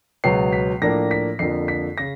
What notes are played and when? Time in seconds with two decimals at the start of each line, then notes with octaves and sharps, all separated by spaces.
0.24 C#2 B2 F#3 B3 C7
0.53 B6
0.82 A2 F3 A#3 D4 A#6
1.11 B6
1.39 F2 D3 F3 A#3 C7
1.68 B6
1.98 C#3 A#6